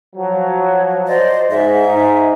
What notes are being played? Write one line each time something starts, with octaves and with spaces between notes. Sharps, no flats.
F3 F#3
C5 D5 D#5
G#2 E5
G#2 D#4